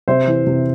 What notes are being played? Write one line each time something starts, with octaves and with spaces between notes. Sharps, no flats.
C3 C5 E5
E3
C3